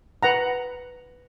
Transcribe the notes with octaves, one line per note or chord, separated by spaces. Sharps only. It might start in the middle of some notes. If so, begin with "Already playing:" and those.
B4 F#5 A#5